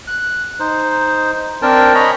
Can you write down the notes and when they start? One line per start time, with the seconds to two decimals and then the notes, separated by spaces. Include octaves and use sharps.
0.08 F#6
0.60 D#4 C5
1.62 C4 D4 A#4 G5 A5
1.95 C#5 D#5 G#5 A#5 B5